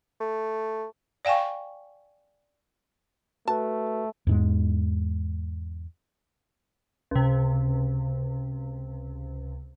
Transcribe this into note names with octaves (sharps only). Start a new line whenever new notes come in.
A3
D5 F5 G5 G#5 C#6
A3 F#4 B4 A5
E2 G#2 G#3
C#2 C3